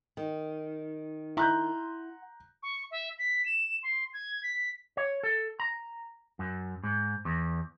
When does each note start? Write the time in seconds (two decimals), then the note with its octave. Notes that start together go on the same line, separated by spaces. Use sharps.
0.17 D#3
1.37 E4 F#5 A#5 C6 F#6 G6
2.63 C#6
2.91 E5
3.19 B6
3.46 E7
3.83 C6
4.14 G#6
4.43 B6
4.97 C#5
5.23 A4
5.60 A#5
6.39 F#2
6.83 G#2
7.25 E2